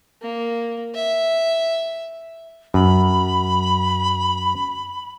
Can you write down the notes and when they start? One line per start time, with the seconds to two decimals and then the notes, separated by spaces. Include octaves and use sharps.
0.22 A#3
0.95 E5
2.74 F#2 B5